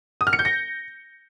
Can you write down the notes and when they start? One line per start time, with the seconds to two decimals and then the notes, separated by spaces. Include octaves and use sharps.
0.21 D#6
0.27 F6
0.33 C#7
0.39 G6
0.45 A#6